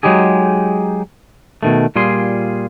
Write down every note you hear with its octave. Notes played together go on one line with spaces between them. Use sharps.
F#3 G#3 D#4 G4 G#4
B2 D#3 A3
A#2 G3 F4 G#4 C6